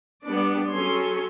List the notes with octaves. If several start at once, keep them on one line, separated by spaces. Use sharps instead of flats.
G3 B3 D4 D5
F#3 C#4 G#4 A4 C#5 C6